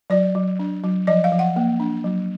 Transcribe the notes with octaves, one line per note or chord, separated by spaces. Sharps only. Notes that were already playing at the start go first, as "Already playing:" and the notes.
F#3 D5
F#3
D4
F#3
F3 D#5
F5
F3
F#5
A#3
D4
F#3